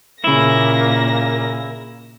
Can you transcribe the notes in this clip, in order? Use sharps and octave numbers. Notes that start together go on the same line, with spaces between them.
A#2 C#3 A#3 E4 A#6